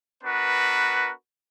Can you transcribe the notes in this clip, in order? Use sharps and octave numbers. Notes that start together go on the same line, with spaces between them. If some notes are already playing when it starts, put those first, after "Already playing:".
B3 D4 F#4 A#4 B4